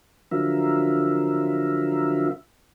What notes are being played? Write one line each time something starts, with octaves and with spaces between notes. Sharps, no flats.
D3 F3 F#3 F4 A#4 E5